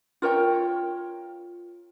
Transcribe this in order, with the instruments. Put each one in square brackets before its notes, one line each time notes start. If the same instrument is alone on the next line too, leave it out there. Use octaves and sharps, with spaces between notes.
[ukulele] F4 A#4 C#5 G5